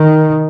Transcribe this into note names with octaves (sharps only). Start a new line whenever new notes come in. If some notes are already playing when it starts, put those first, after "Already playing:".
Already playing: D#3